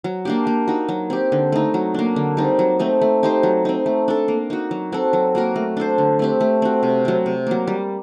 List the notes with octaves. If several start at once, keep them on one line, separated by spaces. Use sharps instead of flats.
F#3
A#3 D4 G4
A#3
D#4 F#4
F#3
C4 G4
D3
A3 D#4
F#3
A#3 D4
D3
G3 C4 D#4
F#3
A3 C4 D#4
A3
D#4 G4 C5
F#3
C4 D#4
A3
D4 A4
A#3
D#4 F#4
F#3
C4 F#4 A4
F#3
A#3 F#4 A#4
A3
D4 A4 C5
D3
A3 C4 G4
A3
C4 F#4
C3
F#3 C4
C3
F#3 A#3
G3